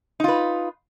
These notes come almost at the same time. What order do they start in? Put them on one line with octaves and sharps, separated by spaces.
D#4 F4 B4